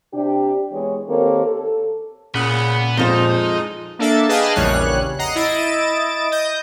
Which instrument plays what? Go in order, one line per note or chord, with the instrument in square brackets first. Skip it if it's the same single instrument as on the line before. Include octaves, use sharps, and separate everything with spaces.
[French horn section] C3 D4 G4
E3 G#3 B3 C#5
D#3 A#3 C4 G4 A4 C#5
A4
[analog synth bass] A#2 [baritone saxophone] C#3 [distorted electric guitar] B4 F#5
[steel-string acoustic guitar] F2 F3 C5 [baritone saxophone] G#3 [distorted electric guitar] D#4
[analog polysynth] A#3 D4 A4 E5 A5
G#4 B4 D#5 F5 G5 A5
A#1 E2 C#3 G3 C#5 F#6
D#5 F#5 A#5 C7
E4 D#5 A6 D7 E7
D#5 G6